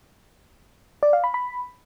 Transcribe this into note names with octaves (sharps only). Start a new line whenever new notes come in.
D5
F5
B5
B5